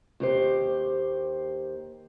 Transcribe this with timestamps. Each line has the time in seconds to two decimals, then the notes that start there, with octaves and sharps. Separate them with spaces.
0.20 D#2 G4 C5